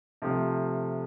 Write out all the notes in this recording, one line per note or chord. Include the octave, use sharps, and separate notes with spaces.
C3 F3 A3